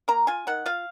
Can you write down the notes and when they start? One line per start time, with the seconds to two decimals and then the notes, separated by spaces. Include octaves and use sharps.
0.08 A#3 A#5
0.27 F4 G#5
0.47 D#3 F#5
0.66 F4 F5